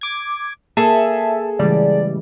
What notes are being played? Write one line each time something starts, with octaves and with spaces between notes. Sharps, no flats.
D6 G#6
A#3 G#4 A4 E5 A5
A2 C#3 E3 G3 G#3 D5